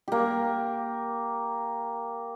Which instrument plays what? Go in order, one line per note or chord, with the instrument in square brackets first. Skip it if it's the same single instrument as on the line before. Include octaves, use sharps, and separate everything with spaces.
[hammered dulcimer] A#3 G4